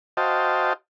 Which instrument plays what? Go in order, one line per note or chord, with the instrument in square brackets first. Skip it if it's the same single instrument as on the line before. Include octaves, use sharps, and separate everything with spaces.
[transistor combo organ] F#4 C5 D#5 F5 G5 A5